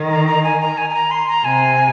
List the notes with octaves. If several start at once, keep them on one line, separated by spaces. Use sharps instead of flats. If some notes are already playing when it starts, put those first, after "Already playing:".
Already playing: D#3
A#5
A#5
G#5
A#5
G#5
G#5
A#5
C6
A#5
C3 G#5